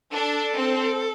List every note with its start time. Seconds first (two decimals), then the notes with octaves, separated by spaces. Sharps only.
0.12 D4 A4
0.55 C4